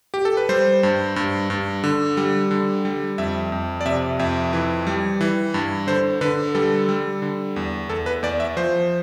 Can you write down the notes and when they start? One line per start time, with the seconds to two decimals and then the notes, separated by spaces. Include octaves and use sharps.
0.14 G4
0.25 A4
0.37 B4
0.49 G3 C5
0.83 G2
1.16 G2
1.50 G2
1.84 D3
2.17 G3
2.51 D3
2.85 G3
3.18 F2 E5
3.52 F2
3.81 D5
3.85 C3 E5
4.19 F2 E5
4.53 E3
4.87 G3
5.21 E3
5.54 G2
5.87 D3 C5
6.21 D3 B4
6.55 G3 A4
6.89 G3
7.22 D3
7.56 E2
7.90 E2 A4
8.06 B4
8.23 E2 D5
8.40 E5
8.57 F3 C5